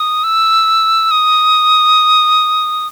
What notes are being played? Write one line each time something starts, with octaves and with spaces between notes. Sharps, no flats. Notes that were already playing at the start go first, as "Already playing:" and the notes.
Already playing: D#6
E6
D#6